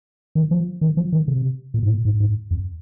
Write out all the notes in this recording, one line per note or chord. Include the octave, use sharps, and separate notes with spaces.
D#3
F3
D#3
F3
D#3
C3
A#2
G#2
A#2
G#2
G#2
F2